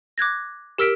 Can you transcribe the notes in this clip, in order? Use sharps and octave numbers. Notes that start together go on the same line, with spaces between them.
D6 F#6 G#6 A#6
G4 A#4 E6 F6 B6 D7